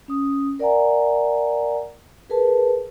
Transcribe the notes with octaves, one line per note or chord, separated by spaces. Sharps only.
C#4 D#6
A#4 D5 E5 F#5 G#5 A#5
G#4 A#4 B4 A5